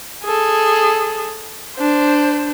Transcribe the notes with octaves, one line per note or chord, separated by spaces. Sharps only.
G#4 A4
D4 C5